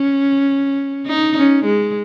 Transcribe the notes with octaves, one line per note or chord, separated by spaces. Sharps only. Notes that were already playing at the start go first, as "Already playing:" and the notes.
Already playing: C#4
D#4
C#4
G#3